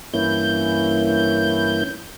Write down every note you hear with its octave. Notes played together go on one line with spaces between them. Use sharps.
G2 E3 A#3 C#4 E4 G6